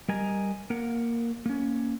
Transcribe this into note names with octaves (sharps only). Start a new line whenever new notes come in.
G3 A#4 D#5 G#5 A#5
A#3 A#4 F#5
A#3 C#4